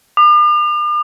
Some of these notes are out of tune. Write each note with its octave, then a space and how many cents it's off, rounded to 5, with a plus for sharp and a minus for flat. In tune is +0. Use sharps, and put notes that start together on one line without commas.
D6 +45